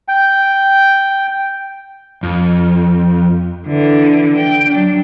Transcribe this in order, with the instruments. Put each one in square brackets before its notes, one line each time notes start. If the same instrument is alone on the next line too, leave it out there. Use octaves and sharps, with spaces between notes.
[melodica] G5
[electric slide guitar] F2
[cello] D3 E3
G5
F#3 D4